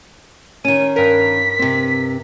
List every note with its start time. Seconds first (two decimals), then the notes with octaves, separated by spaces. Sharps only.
0.65 D#3 C#4 D#7
0.96 G2 A#4 B6
1.59 C3 C4